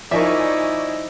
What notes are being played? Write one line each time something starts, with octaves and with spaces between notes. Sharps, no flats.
F3 D#4 E4 A#4 D5 E5 G#5 C#6